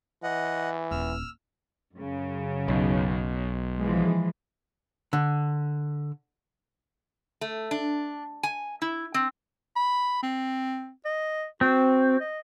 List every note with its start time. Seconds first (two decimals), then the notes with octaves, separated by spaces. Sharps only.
0.23 E3 D#5 F#5
0.91 D#1 E6 F6
1.99 F#2 C#3
2.68 B1
3.78 E3 F3 G#3
5.13 D3
7.41 A3
7.71 D4
8.43 G#5
8.82 E4
9.14 C4
9.76 B5
10.23 C4
11.05 D#5
11.61 C4 F#4
12.20 D#5